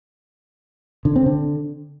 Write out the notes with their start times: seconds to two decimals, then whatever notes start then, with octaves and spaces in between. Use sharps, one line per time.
1.05 D3
1.16 C4
1.26 D3